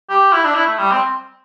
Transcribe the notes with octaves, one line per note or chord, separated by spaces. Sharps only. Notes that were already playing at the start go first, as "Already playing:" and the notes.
G4
E4
D4
E4
A3
G3
C4